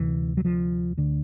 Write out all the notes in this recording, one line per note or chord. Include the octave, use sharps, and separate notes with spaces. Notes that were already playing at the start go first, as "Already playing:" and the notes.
Already playing: D2 C3 E3
F#3
F3
D2 D3